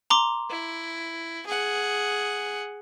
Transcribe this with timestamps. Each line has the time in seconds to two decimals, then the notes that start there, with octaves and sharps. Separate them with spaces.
0.10 A#5 C6 D6
0.50 E4
1.46 G#4 F#5